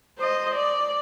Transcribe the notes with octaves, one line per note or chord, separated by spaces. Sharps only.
C5 D#5
D5